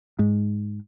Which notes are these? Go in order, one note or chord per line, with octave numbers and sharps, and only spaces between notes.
G#2